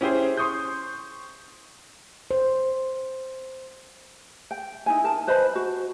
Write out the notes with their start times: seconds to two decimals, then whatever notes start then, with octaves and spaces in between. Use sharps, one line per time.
0.01 C#4 E4 G4 G#4 C5
0.37 C6 C#6 D#6 G6
2.31 C5
4.51 G5
4.86 D#4 E4 G#5
5.04 A#4 A5
5.27 B4 C5 D#5 B5
5.55 F#4